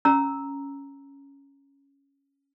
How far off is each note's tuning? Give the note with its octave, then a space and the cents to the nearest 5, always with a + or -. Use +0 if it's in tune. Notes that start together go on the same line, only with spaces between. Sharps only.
C#4 +0 A#5 +0 E6 -10